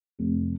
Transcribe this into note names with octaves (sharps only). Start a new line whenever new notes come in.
F1